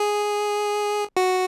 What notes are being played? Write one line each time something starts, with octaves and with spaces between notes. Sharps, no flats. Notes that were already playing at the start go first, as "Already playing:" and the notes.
Already playing: G#4
F#4